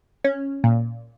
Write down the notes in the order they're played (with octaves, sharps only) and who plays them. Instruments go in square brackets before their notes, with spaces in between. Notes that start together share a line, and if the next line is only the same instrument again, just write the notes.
[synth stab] C#4
A#2